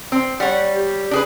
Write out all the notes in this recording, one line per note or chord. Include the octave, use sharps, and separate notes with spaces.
C4
G3 C#5 F#5
G4
D4 G#4 B4